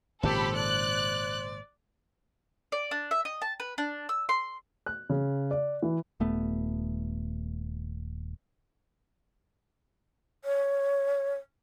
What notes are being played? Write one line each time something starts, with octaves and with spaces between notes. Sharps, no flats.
G#1 A#2 C#3 G4 A4 C5 B5
D5 F#6
D5
D4
E5
D#5
A5
B4
D4
E6
C6
F#6
C#3
D5
E3
D#1 A3 B3
C#5